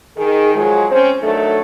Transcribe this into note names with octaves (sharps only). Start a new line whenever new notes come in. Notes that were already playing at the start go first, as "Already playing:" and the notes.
D#3 G#4
F3 F#3 G#3
C4 C#4 C5
D#3 F#3 A3 D4 A4